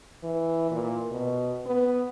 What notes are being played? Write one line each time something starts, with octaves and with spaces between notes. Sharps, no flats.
E3
A#2
B2
B3